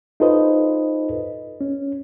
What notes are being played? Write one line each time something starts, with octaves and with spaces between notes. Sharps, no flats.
D#4 F4 A4 B4 C5 D#5
C#4